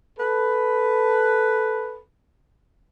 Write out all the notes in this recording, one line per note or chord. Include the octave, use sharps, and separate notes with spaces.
A4 B4